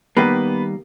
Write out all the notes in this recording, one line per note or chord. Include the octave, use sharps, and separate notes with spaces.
D#3 G3 A#3 B3 B4